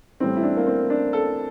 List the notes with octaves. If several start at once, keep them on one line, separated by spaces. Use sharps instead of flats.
A2 E3 G3 C4
E4
D4
A#3
C4
D4
A4